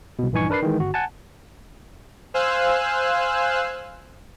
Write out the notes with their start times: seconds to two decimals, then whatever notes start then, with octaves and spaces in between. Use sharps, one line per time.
0.19 C2 B2
0.32 A#1 G2 E3 D#4 G#5 C#6
0.50 D4 A#4 B4 D5 C7
0.62 D#3 E3 G#3
0.79 G1 F#4
0.94 F#5 G#5 A5
2.34 C5 F5 G#5 E6 F#6